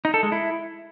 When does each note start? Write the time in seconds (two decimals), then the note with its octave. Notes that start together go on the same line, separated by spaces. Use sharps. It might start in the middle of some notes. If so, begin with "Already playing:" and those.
0.05 D#4
0.14 A4
0.23 G#3
0.32 E4